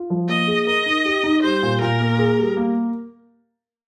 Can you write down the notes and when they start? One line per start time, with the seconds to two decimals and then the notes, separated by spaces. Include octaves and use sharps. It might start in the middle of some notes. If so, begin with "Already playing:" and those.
Already playing: F4
0.10 F3
0.28 A#3 D#5
0.47 G#4
0.67 A#4 D#5
0.86 D#4
1.05 G4
1.23 D#4
1.42 G3 C5
1.63 A#2
1.81 A#2 A#4
2.00 A#3
2.19 G#4
2.39 G3
2.57 A#3